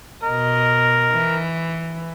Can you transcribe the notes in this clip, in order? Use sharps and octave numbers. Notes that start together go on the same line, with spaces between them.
B2 A#4 D#5
E3